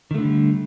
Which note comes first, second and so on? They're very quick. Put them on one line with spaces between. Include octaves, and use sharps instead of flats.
D#3 A3 D3 G3